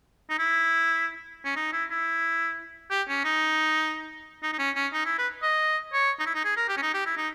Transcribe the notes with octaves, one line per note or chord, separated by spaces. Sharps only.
D#4
E4
C#4
D#4
E4
E4
G4
C#4
D#4
D#4
D#4
C#4
C#4
D#4
E4
B4
D#5
C#5
D#4
E4
D#4
G#4
A#4
G4
C#4
D#4
G4
E4
D#4